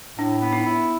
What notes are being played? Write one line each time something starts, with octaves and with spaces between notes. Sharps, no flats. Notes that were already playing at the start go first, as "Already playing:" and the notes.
A2 D4
B3
D#4
E4